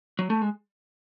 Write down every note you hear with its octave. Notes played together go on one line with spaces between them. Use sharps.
F#3
A3
G#3